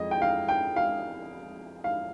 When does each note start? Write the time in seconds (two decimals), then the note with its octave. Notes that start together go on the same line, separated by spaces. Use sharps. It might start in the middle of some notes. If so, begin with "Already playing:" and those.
Already playing: F2 G#3 D#5
0.11 G5
0.22 F5
0.48 G5
0.76 F5
1.84 F5